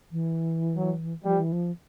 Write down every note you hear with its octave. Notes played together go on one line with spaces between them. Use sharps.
E3
F#3
F3 G3
E3
F3